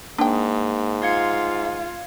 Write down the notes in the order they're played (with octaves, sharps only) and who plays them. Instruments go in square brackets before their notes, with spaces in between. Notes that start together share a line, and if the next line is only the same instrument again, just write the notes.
[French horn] G#2 [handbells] A#3 [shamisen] D4 G5
[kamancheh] F4 [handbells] F5 G#6 C#7